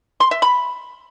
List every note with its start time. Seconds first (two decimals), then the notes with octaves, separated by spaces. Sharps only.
0.20 C6
0.31 E5
0.42 B5